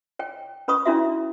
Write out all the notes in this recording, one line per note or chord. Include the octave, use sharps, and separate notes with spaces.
C#5 G5
C#4 B4 B5 C#6 D#6
C#4 D4 E4 F#4 E5